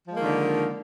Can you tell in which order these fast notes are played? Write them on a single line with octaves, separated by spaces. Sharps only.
F3 G#3 A#3 D#3 D3